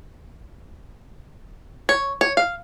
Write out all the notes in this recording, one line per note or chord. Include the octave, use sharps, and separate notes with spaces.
C#5
C#5
F5